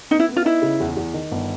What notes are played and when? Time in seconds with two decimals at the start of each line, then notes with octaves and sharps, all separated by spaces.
0.11 B3 D#4
0.20 E4
0.29 B3
0.37 F4
0.45 D#4 E4
0.62 C#3
0.80 E2
0.97 E2
1.14 D#3
1.31 G1